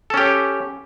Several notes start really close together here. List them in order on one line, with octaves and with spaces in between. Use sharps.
A4 C#4 G4